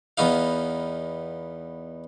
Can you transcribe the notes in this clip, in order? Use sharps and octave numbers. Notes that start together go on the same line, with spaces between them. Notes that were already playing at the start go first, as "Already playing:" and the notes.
E2 B3 D#4 F5